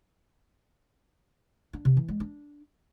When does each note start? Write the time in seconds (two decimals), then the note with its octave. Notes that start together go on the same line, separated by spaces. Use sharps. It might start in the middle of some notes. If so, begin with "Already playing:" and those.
1.73 D4
1.85 C3
1.97 E3
2.08 G#3
2.20 D4